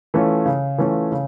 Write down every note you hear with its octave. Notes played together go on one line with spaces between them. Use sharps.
E3 A3 C#4 F4
C#3
E3 A3 C#4 F4
C#3